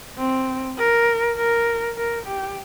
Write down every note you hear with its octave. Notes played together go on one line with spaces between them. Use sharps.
C4
A#4
A#4
A#4
G4